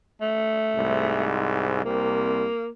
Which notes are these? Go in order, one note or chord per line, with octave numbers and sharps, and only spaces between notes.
A3
C2 G#2
C2 C3 A#3